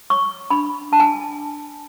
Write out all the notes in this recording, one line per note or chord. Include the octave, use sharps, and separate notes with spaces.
C#5 C#6
D4 B5
D4 A5
G#5